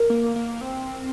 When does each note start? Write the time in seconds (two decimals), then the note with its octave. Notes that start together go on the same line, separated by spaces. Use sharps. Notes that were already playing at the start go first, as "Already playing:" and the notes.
Already playing: A#4
0.10 A#3
0.36 A#3
0.61 C4